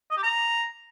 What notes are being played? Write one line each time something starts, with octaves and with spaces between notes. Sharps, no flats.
D#5
G4
A#5